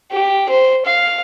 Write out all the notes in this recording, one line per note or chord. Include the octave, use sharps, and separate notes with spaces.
G4
C5
F5